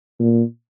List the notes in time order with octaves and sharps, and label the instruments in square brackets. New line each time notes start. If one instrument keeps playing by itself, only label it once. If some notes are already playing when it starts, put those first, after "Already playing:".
[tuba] A#2